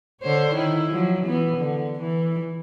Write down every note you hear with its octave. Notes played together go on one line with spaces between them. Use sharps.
D3 C5 C#5
D#3 E4
F3 F#3
E3 B3
D3
E3